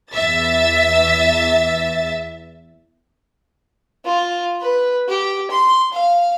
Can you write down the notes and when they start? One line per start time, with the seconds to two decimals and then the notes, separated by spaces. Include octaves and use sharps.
0.13 E2 E5 A6
4.05 F4
4.61 B4
5.08 G4
5.50 C6
5.93 F5